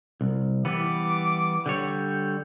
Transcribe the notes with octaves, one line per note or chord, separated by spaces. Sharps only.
C2
E3 G3 B3 D6
D3 G3 C#5 G6